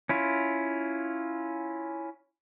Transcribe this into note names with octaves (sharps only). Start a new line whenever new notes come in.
C#4 E4 F4